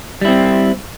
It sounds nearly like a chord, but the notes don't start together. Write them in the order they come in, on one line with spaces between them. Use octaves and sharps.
G3 E4 C4